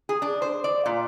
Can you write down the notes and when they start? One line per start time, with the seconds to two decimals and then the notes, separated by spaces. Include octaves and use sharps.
0.09 G#4
0.22 D4
0.42 C5
0.64 D5
0.86 A#2